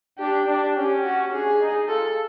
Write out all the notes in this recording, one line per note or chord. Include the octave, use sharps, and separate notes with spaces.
D4 G4
D4
C#4 G4
F#4
D4 G#4
D#4
F4 A4